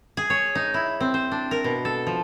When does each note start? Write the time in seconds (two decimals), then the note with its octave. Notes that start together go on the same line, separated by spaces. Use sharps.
0.17 G#4
0.30 C#5
0.55 D#4
0.74 E4
1.00 C4
1.14 C5
1.31 D4
1.51 A#4
1.64 B2
1.85 A4
2.07 F3